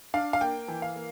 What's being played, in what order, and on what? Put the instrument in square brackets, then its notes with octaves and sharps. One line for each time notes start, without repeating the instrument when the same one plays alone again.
[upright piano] D4 F5
F5
A#3 G5
E3
F5
A#3